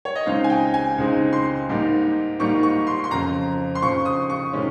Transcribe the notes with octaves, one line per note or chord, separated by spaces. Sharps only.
C#5
D#5
C#2 C#3 G#3 C4 D#4 F5
G#5
G5
G#5
C#2 C#3 G#3 C4 D#4
C6
G#2 G3 A#3 D#4
G#2 G3 A#3 D#4 C#6
C#6
C6
C6
F2 C#3 F3 A#5
C6
F2 C#3 F3 C#6
D#6
C#6
C3 D#3 G#3 C#4